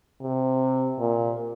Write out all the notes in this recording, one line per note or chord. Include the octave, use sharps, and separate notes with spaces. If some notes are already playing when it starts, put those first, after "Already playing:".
C3
A#2